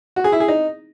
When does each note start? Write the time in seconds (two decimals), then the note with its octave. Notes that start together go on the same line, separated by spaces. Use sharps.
0.16 F#4
0.24 G#4
0.32 E4
0.40 G#4
0.48 D#4